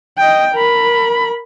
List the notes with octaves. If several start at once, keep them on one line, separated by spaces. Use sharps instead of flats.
D#5 G5
A#4 B5